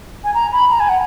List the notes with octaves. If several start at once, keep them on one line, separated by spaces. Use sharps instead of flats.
G#5
A#5
B5
A#5
G#5
F#5